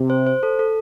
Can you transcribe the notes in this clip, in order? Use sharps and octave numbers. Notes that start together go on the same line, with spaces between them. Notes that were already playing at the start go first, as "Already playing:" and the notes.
Already playing: C3
C5
C5
A4
A4